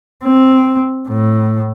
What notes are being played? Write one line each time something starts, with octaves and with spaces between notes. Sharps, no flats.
C4
A2